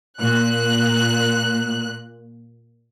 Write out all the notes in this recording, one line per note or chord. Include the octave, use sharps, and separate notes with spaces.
A#2 F#6